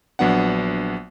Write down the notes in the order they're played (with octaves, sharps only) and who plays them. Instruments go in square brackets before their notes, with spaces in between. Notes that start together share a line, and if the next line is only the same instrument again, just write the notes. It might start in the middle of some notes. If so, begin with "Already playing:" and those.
[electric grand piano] A#1 F#3 B3 D4 F#5